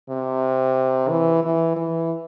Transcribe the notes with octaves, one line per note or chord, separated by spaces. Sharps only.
C3
E3
E3
E3